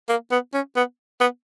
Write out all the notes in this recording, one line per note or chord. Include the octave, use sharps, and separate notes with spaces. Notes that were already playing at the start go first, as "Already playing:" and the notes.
A#3
B3
C#4
B3
B3